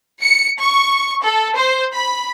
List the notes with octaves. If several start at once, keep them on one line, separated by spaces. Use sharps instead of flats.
C#7
C#6
A4
C5
B5